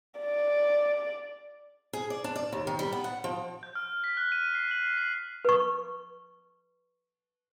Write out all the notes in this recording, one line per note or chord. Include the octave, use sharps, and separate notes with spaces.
D5
G#4
D5
D4
D5
D#2
D#3
G3
B3
F#5
F3
G6
F6
B6
F#6
D#7
C7
F#7
C7
B4 C#6